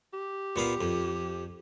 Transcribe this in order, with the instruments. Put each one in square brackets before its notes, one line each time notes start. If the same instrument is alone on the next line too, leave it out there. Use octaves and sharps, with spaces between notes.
[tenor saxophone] G4
[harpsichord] A#2 B3 F5
F2